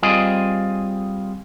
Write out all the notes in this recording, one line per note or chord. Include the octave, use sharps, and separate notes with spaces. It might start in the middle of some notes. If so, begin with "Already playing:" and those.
G3 C4 F4 G#4 D#5